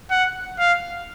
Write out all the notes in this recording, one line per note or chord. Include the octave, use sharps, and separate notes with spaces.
F#5
F5